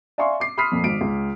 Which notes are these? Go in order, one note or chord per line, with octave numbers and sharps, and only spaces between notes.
D5 E5 F5 G#5 C6 C#6
D6 C7
B5 C6 D#6 F6 B6 C7
F2 A#2
G#1 D7
C#2